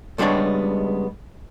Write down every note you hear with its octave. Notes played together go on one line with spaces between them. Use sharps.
C#2 G3 G#3 B3 D4 C#5